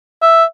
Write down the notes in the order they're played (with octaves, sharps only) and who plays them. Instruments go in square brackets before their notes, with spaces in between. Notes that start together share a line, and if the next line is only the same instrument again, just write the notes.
[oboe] E5